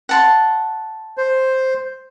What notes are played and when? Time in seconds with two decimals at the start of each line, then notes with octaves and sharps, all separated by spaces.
0.09 F#5 A5 C6
1.17 C5